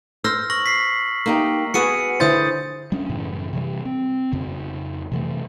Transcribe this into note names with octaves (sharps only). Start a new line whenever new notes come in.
C5 E6 F6 A#6
C#6 A#6 F#7
B6 C7
A#3 D#4 G4
B3 F#4 G#4 C#7 D#7
D3 E4 C5 D#6 G6 A6
G3 C#4 D4
F#2 A2 C#3 E3
C3 E3 G3
C4
F2 C#3
C3 E3 A3